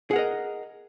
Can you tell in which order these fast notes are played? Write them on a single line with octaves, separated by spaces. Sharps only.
G#4 F#5 A#4 D#5